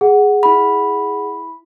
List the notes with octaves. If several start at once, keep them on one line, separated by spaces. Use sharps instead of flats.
G#4 F#5
E4 B5